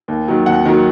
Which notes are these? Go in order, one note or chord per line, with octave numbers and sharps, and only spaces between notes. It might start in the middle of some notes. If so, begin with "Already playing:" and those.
D#2
D#3 F#3
D#2 F#5
D#3 F#3